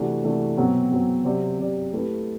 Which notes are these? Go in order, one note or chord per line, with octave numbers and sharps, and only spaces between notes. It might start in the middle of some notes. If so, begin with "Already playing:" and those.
Already playing: C3 E3 A3 D4 F#4
C3 E3 A3 D4 F#4
B2 F#3 C4 F#4
B2 F#3 C4 F#4
C3 F#3 C4 G4 D5
C3 F#3 C4 G4 D5
A3 E4 G4 B4